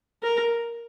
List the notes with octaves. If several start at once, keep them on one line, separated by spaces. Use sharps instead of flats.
A#4